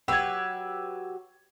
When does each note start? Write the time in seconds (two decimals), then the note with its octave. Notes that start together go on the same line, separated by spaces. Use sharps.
0.08 F#3 G4 B4 E6 G#6